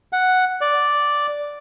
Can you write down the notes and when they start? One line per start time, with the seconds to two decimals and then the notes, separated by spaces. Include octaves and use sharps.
0.13 F#5
0.61 D5